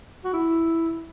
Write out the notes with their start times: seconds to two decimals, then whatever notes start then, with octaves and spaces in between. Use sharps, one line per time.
0.24 F#4
0.33 E4